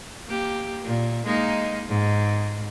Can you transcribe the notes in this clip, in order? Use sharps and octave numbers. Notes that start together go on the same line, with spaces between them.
A#3 G4
A#2
G#3 A#3 D#4
G#2